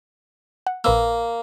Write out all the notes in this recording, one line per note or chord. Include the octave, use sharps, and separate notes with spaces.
F#5
A#1 A#3 B4 E6